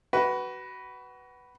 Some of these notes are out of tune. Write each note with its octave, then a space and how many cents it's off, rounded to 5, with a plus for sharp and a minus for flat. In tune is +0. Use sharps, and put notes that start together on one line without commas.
F#4 +25 B4 +0